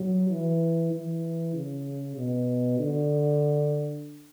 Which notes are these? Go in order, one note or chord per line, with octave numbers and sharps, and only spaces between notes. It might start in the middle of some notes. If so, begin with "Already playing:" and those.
Already playing: F#3
E3
E3
C#3
B2
D3